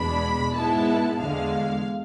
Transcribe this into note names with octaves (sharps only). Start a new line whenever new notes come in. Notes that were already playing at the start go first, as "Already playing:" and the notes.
Already playing: E2 B2 G#3 D4 B5
G#2 G#3 B3 E4 A5
E2 D3 G#3 F5